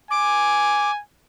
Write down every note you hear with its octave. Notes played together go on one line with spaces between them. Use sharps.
G#5 D6